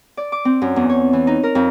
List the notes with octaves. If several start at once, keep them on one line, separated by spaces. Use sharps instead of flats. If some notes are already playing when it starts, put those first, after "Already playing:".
D5
D6
C4
F#2
E2
C#5
E3
D#4
A#4
F2